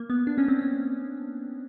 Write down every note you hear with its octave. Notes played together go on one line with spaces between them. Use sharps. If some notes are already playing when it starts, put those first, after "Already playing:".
Already playing: A#3
B3
D4
C#4
C4
C#4